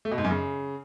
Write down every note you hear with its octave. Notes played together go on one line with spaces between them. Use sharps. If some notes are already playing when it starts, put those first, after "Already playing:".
A3
B2
G#2
F#2
C#3